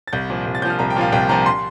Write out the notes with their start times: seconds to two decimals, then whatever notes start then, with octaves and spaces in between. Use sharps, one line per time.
0.08 A6
0.13 C2 G6
0.30 A#2 F3
0.46 C2
0.55 A6
0.62 A#2 F3 G6
0.70 F6
0.79 C2 A#5
0.90 G5
0.96 A#2 F3 F5
1.12 C2 G5
1.29 A#2 F3 A#5
1.46 C6